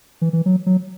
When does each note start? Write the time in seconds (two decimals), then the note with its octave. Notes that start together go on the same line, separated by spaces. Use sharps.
0.21 E3
0.33 E3
0.46 F#3
0.66 F#3